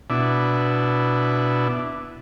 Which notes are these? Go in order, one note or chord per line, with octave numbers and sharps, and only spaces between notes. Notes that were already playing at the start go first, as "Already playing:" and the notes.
B2 D4 E4